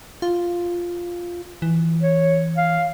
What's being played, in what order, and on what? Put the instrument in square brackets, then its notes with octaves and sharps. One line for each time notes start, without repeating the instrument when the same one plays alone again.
[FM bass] F4
E3
[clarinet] C#5
F5